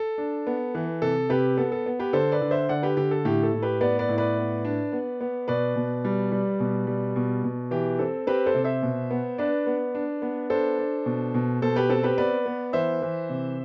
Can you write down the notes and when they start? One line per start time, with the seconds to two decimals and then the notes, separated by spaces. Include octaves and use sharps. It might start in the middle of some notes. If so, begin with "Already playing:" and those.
Already playing: A4
0.18 D4
0.47 B3
0.75 E3
1.02 C3 A4
1.29 C3 G4 B4
1.57 B3 A4
1.72 A4
1.86 B3
1.99 G4 B4
2.13 D3 A4 C5
2.32 B4 D5
2.41 D3
2.51 C5 E5
2.69 D3 D5 F#5
2.83 G4 B4
2.97 D3 G4
3.11 A4
3.25 A2 G4
3.43 A4
3.53 A2
3.62 G4 B4
3.81 B3 B4 D5
3.99 B4 D5
4.09 A2
4.18 B4 D5
4.37 B3
4.65 D4
4.92 B3
5.21 B3
5.48 B2 B4 D5
5.76 B2
6.05 G3
6.32 G3
6.60 B2
6.87 G3
7.16 B2
7.44 B2
7.71 E3 G4
7.99 C4 A4
8.27 C4 G4 B4
8.46 A4 C5
8.55 C3
8.64 C5 E5
8.82 B2
9.11 B3
9.38 D4 B4 D5
9.66 B3
9.95 D4
10.22 B3
10.50 D4 A4 C5
10.79 D4
11.06 B2
11.34 B2
11.62 B2 A4 C5
11.76 G4 B4
11.89 C4 A4
12.04 G4 B4
12.17 B3 B4 D5
12.46 B3
12.73 E3 C5 E5
13.02 E3
13.30 C3